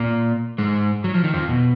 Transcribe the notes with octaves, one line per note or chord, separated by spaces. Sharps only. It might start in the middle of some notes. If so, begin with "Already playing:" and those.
Already playing: A#2 A#3
G#2 G#3
F#3
F3
D#3
F2 F3
B2